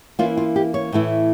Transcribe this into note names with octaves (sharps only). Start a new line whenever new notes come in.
E3 A#3 C#4 E4 F4
F4
G4
C#5
A2 E3 A3 E4